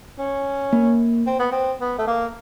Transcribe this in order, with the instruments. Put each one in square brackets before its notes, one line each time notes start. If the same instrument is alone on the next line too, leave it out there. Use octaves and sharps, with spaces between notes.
[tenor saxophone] C#4
[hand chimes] A#3
[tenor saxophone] C4
B3
C4
B3
A3
A#3